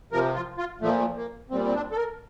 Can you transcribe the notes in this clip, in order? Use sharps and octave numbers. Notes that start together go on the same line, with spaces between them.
C3 F3 A#4
F4
F4
A#2 F3 A3
A3
A#3
A#2 G3 C4
C4
D4
A4
A#4